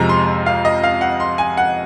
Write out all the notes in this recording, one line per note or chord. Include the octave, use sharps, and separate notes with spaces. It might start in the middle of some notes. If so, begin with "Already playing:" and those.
Already playing: F2 C3 F3 G#3 A#5
C6
F5
D#5
F5
F#5
C6
G#5
F#5